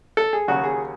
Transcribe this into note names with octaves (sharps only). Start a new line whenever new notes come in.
A4
G#4
D#2 C#3 F#3 F#4
G#4